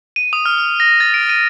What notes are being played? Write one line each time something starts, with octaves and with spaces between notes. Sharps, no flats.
D#7
D#6
F6
F6
A#6
A6
D7
D#7